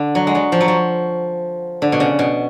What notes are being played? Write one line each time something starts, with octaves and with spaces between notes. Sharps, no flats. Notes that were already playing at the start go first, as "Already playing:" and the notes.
Already playing: D3
F#3
G#3
F#3
F3
F#3
F3
D3
B2
C#3
B2